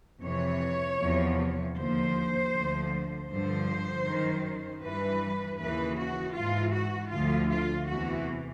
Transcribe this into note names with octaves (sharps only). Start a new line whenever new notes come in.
F2 C3 E3 C#5
E2 C3 F3
D#2 D3 F3 C5
D2 D3 F3
G2 D3 F3 C5
F#2 D#3
G2 E3 B4
D#2 C#3 E3 B4
F#4
G#2 E3 F4
F#4
D2 D3 F3 F4
F4
E2 C3 E3 F#4